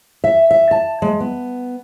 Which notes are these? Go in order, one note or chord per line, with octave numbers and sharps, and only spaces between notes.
E5
E5
A5
G#3
B3